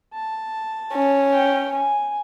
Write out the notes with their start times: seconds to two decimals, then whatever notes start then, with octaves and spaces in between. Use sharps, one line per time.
0.14 A5
0.93 C#4
1.33 G5
1.72 G#5